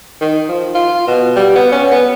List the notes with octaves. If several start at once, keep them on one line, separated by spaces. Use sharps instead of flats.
D#3
F3
F4
B2
G3
B3
C#4
B3